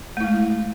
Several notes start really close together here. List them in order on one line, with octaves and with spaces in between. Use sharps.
A3 E4 G#3